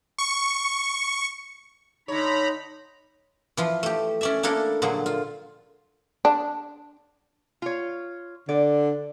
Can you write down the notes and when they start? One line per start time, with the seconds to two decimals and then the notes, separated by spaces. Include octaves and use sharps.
0.18 C#6
2.08 D3 D#4 C#5 A#5 B5
3.57 E3 F3 F4
3.83 A3 G4
4.21 C#4 D5 E5
4.43 A#3 D4 E4 A4 A#4
4.82 A#2 D3 F3 F#3 G#4
5.06 F4
6.25 D4
7.62 F4 C#5
8.49 D3 D5